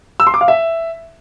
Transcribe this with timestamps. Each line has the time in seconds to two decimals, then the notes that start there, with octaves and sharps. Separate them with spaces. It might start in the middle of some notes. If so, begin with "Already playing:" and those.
0.20 E6
0.27 C6
0.34 D6
0.41 F5
0.48 E5